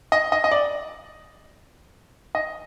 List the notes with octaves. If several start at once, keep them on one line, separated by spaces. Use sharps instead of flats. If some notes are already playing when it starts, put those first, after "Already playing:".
D#5
D#5
D#5
D5
D#5